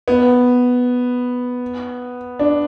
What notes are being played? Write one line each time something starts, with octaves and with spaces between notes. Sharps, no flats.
B3
D4